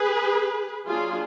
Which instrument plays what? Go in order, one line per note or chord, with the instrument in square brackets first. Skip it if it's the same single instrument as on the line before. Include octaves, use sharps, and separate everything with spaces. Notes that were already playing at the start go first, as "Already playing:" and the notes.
Already playing: [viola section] G#4 B4
F#3 A#3 D4 F4 G#4